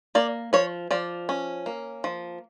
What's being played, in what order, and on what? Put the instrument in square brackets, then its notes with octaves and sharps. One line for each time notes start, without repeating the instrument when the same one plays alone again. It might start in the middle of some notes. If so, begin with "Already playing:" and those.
[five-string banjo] A#3 D5
F3 C#5
F3 D5
C#4
A#3
F3